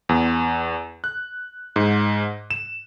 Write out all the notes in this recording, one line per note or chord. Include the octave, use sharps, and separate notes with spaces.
E2
F#6
G#2
E7